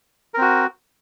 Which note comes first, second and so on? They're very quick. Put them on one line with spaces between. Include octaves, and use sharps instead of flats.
A#4 C4 F#4